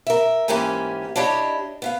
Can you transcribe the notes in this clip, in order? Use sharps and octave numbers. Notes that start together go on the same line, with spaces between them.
A#4 E5
G#2 E3 A#3 C#4 G4 G#5
D4 E4 G4 C#5 D#5
B3 E5 F5